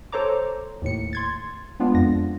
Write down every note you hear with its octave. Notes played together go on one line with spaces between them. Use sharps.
A4 C5 C#5 A#5 D6
D#2 A2 C#7
C6 G#6 A6
G#3 B3 D4 F4
F2 A#6